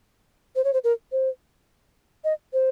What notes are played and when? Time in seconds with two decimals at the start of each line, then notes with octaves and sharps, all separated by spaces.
0.55 C5
0.64 C#5
0.73 C5
0.84 A#4
1.12 C5
2.24 D#5
2.53 C5